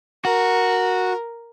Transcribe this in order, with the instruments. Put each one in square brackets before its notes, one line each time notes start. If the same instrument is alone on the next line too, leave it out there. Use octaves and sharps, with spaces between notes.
[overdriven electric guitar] F#4 [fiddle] A#4